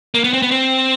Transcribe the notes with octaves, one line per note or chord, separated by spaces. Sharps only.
A#3
B3
C4
B3
C4